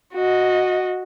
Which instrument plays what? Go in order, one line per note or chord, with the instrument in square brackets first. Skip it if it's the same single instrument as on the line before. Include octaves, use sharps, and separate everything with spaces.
[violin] F#4 D#5